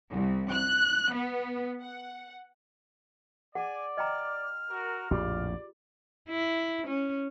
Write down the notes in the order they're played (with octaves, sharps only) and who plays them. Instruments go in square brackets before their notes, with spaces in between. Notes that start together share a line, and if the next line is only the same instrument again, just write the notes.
[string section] C2
F#6
B3
F#5
[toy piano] G#4 F#5 [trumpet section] D5 [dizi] G#5
[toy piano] D#5 G5 A#5 [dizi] F6
[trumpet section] F#4 A#4
[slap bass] A#1 F2 A2 [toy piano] F4 G4 G#4 [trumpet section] D5
[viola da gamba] E4
C#4